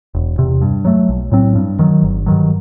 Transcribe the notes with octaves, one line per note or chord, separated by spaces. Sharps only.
E1
E2 C3
G2
F#3 A3
B1
A2 F#3 C4
G2
D#3 F#3
G1
G2 D#3 F#3